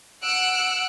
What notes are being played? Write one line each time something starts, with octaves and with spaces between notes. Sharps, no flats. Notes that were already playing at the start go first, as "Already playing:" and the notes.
F#5 E6 F#6 D7